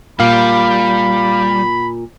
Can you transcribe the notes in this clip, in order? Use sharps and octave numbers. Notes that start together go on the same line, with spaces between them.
A#2 G3 F5 B5